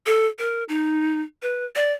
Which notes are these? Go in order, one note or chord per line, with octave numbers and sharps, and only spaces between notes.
A4
A#4
D#4
B4
D5